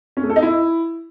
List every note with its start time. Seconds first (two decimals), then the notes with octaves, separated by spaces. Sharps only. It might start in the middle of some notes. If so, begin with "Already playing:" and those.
0.17 C#4
0.23 A3
0.30 A4
0.36 D#4
0.42 E4